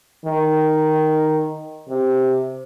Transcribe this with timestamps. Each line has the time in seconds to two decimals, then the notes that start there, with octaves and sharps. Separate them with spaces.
0.25 D#3
1.89 C3